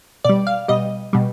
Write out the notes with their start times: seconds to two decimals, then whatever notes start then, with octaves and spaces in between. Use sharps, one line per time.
0.25 B2 G3 D5
0.47 F5
0.68 B2 G3 D#5
1.13 B2 G3